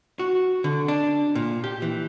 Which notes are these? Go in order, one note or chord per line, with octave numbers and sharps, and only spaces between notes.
F#4
D3
D4
A#2
G4
E3